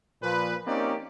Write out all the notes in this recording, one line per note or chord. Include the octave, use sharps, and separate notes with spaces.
A#2 F3 B4
A#3 C4 C#4 D#4 G4 D5